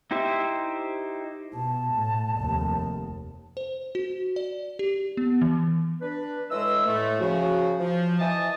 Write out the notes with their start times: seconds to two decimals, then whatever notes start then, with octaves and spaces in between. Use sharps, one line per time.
0.11 D#4 E4 G4 C5 E5
1.53 B2 A5
1.94 A2
2.39 F1 D#2
3.57 C5
3.95 F#4
4.36 D5
4.79 G4
5.17 B3
5.41 E3
6.01 D4 B4
6.50 A2 E3 G#3 D#5 E6
6.86 A2 A3
7.20 C#3 F3 F#4
7.80 F3
8.20 E3 E4 D#5 G#5 A5 D#6